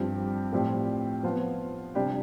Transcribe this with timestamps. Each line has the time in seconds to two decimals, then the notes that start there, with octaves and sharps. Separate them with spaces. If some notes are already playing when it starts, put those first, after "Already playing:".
Already playing: G2 F3 C4 G4
0.52 A2 F3 C4 G4 D5
1.23 F3 B3 F4
1.95 C3 G3 D4 G4